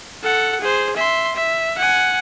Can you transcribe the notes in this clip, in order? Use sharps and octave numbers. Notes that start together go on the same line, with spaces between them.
A4 F#5
G#4 C5
E5 C6
E5
F#5 G#5